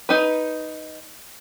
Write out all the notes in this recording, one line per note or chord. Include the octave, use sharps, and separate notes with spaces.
D#4 B4